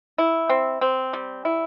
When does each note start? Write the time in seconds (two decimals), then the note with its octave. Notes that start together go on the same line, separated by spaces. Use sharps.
0.18 E4
0.49 C4
0.81 C4
1.13 G3
1.45 E4